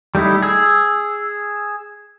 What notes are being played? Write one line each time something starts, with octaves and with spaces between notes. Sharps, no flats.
G3 A3 D#4 E4
G#4 E6